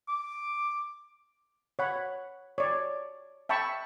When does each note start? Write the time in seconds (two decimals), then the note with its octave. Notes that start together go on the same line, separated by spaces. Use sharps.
0.08 D6
1.79 C#5 F#5 B5
2.58 C#5 D5
3.49 E5 G5 A5 B5 C#6 E6